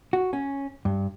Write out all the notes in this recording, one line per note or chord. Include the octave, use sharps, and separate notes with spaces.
F#4
C#4
G2